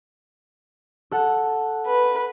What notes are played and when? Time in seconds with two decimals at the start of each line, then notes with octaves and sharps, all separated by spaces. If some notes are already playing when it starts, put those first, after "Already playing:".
1.11 A4 F#5
1.87 B4